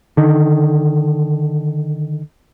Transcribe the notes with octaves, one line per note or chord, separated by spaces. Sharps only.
D3 D#3